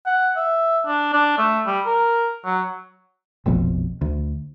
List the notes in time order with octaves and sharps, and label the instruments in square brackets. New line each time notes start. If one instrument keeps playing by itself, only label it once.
[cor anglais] F#5
E5
D4
D4
A3
G3
A#4
F#3
[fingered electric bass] F1 A#1 F2 B2
D2